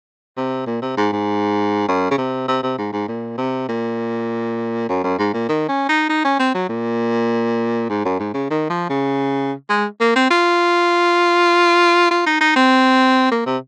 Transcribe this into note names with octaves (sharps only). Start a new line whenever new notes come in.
C3
A#2
C3
G#2
G#2
F#2
C#3
C3
C3
C3
G#2
G#2
A#2
C3
A#2
F#2
F#2
G#2
A#2
D#3
C#4
D#4
D#4
C#4
C4
F#3
A#2
G#2
F#2
G#2
C#3
D#3
F3
C#3
G#3
A#3
C4
F4
F4
D#4
D#4
C4
A#3
C3